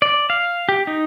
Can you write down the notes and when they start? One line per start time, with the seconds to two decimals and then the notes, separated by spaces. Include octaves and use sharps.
0.02 D5
0.30 F5
0.69 G4
0.87 D#4